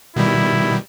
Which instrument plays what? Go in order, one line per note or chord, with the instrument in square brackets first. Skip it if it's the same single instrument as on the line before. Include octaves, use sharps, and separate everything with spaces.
[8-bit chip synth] B2 D#3 G3 [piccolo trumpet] E4